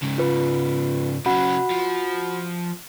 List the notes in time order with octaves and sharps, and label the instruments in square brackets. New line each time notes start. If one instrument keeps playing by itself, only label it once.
[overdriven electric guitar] G#2 C#3
[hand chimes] F4 B4
[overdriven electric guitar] C#3 F#3 [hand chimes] F#4 F#5 B5
[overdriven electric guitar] F3